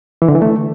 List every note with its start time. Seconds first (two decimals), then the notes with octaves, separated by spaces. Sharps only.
0.22 E3
0.28 D3
0.35 E3
0.42 A3